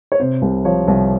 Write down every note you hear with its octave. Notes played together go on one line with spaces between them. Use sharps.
C#5
C3 C5
C2
F3 C#5
C2